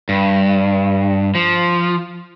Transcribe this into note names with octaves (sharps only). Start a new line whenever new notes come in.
G2
F3